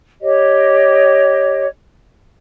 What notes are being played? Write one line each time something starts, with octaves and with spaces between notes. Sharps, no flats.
G4 C#5 D#5